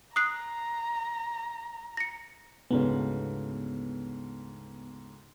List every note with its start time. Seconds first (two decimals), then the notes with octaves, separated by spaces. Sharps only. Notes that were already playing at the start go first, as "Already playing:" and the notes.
0.16 A#5 D#6 F#6 C7
1.97 A#6 C#7
2.71 D2 G#2 C#3 B3